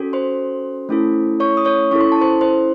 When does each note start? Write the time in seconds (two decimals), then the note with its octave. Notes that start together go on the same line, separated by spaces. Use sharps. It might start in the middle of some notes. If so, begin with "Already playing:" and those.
Already playing: C#4 F#4 A4
0.13 C5 C6
0.89 A3 C#4 E4 A4
1.40 C#5 C#6
1.57 D#6
1.65 C#5 C#6
1.91 C#4 E4 A4 C#6
2.01 C6
2.12 A5
2.21 C5 C6
2.41 C5 C6